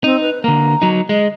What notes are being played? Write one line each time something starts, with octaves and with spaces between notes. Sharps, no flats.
C4 D#4
B4
D3 A#3 A#5
F#3 D#4
G#3 D#5